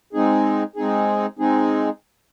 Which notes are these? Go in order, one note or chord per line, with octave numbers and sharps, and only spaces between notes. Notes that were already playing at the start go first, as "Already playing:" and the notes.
G#3 C4 D#4 G#4
G#3 C4 D#4 G#4
G#3 C4 D#4 G#4